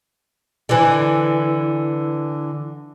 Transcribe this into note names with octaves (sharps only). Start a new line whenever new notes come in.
D3 E3